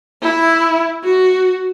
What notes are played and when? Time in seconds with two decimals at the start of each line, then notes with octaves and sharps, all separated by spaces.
0.22 E4
1.04 F#4